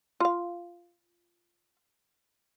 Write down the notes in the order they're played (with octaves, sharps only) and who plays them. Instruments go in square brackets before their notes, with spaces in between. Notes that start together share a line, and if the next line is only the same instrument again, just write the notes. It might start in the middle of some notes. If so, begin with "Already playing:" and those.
[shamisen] F4 F5